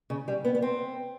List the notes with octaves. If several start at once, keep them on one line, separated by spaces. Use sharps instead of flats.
C#3
G3
B3
B3
C4